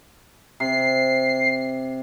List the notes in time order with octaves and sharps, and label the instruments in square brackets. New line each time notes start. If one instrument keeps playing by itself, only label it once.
[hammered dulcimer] C3 [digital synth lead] C7